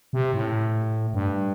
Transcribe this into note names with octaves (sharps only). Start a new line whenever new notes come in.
C3
A2
G2